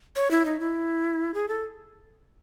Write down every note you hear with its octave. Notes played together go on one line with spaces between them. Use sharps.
C#5
E4
D#4
E4
G#4
A4